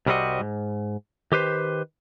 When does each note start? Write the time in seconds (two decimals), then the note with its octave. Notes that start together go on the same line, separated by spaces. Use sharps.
0.06 C2 C3 G3 C4 F#4 D#5
0.41 G#2
1.32 D#3 G4 B4 C5